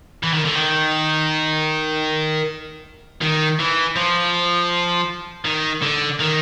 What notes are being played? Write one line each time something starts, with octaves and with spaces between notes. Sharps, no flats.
E3
D#3
D3
D#3
D#3
E3
F3
D#3
D3
D#3